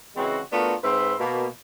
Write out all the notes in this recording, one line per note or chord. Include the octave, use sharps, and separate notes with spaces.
C#3 E3 G#3 C4 F#4
A3 B3 D4 F4 F#4 A#4
G#2 C4 B4 E5 B5 C6
B2 A#3